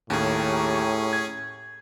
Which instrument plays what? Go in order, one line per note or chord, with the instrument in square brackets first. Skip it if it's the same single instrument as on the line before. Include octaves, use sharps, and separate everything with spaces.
[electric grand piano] D#2 [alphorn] A2 [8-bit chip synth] C#4 G#4 [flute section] G4 A#5 C#6
[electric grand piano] G#6